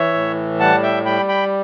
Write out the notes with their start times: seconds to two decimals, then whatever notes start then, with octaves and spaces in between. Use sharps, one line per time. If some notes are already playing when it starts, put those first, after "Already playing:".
Already playing: E3 C#5 E5
0.13 A2
0.60 G3 F#5 A5
0.83 E5 G5
1.05 G3 G5 B5
1.29 G5 B5